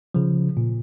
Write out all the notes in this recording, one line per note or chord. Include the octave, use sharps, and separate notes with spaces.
C#3 F3
A#2